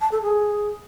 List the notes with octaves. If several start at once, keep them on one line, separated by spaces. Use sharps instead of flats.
A5
A4
G#4